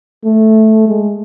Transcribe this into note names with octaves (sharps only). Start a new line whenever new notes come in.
A3
G#3